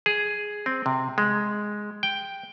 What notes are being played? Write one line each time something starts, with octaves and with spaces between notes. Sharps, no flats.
G#4
C4
C3
G#3
G5